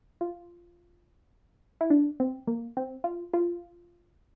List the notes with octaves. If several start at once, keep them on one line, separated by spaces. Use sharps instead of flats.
F4
E4
D4
C4
A#3
C4
F4
F4